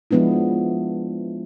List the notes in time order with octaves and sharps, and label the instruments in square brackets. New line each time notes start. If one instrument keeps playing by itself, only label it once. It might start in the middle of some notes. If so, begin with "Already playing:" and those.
[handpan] F3 G#3 B3 D4 E4